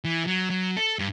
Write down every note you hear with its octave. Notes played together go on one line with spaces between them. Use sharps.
E3
F#3
F#3
A4
G2